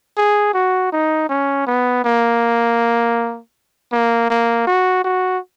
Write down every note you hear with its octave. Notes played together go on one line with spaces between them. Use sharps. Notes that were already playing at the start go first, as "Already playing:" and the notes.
G#4
F#4
D#4
C#4
B3
A#3
A#3
A#3
F#4
F#4